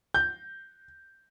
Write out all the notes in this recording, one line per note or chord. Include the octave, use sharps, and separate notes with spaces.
G6